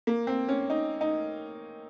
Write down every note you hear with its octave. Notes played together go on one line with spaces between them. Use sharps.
A#3
C4
C#4
D#4
D#4